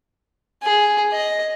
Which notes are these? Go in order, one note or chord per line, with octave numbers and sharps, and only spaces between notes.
G#4
D#5